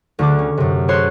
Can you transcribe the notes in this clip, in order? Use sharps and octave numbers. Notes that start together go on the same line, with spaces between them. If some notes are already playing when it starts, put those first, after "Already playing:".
D2 D3 D6
C#4
F#2 C3
A4 C5 C#5 C6 F#6